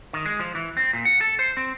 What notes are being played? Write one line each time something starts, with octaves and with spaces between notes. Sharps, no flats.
D#3
G#3
F3
E3
C4
A#2
F#5
A4
C5
C4